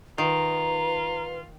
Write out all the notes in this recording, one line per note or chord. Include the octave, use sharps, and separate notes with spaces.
D#3 F4 B4 A#5